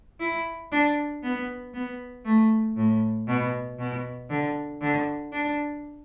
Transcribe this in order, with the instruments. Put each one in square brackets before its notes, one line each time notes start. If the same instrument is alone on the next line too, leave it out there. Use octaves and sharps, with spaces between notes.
[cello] E4
D4
B3
B3
A3
A2
B2
B2
D3
D3
D4